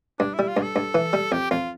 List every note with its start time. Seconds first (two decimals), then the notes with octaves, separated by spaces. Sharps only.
0.19 G2 D4
0.34 E4
0.39 G3
0.48 F4
0.57 G2
0.62 A4
0.76 G2
0.95 E3
1.13 G3
1.32 F2 G4
1.51 F2 F4